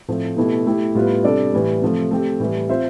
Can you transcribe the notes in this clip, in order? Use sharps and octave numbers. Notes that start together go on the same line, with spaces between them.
A2 F3 A3 C4
B2 A3 E4 G4
A3 E4 G4
A2 G3 B3 F4 B4
C3 G3 D4 A4 D5
A2 E3 G3
C3 F3 A3
A3 C4 G4
A2 E3 G3
C4 F4 C5 E5